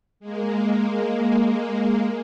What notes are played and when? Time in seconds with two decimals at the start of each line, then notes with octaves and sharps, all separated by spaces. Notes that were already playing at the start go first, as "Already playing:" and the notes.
0.20 G#3 A#3